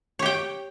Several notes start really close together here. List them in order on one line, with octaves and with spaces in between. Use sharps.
C#5 G4 G5